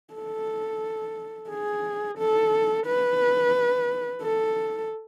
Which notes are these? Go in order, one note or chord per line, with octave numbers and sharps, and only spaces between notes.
A4
G#4
A4
B4
A4